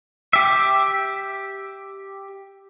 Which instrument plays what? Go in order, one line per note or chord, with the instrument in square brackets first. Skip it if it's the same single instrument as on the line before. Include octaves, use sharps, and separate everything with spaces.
[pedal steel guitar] G4 E5